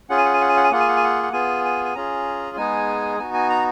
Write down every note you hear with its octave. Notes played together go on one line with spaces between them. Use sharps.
C#4 F4 G#4 F#5
G#5
F#5
G#5
F#5
G#5
F#5
G#5
A#3 F4 G#4 F#5
G#5
F#5
G#5
F#5
F#5
B3 F4 G#4 G#5
G#5
G#5
C#4 F4 G#4 A#5
G#3 B3 D#4 G#4 G#5
B3 D#4 F#4 G#5
G#5
A#5